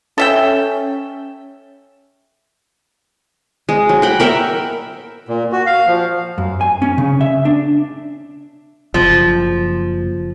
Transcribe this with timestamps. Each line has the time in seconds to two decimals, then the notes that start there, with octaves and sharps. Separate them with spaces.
0.18 C#4 A4 E5 G5
3.69 G#3
3.89 F#3
4.02 F#5 G5 B5
4.20 A#4 E5 F#5 G5
5.28 A#2
5.52 F#4
5.66 F5
5.87 F3
6.38 F#2
6.61 G#5
6.82 C#4
6.98 C#3
7.21 E5
7.45 D4
8.94 F#1 F3